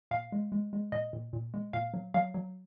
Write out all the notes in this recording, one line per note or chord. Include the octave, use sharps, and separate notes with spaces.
A#2 F5
G#3
G#3
G#3
A#2 D#5
A#2
A#2
G#3
A#2 F5
F#3
F#3 F5
F#3